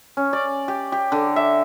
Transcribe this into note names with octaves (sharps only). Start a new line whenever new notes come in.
C#4
D5
G4
G4
D3
E5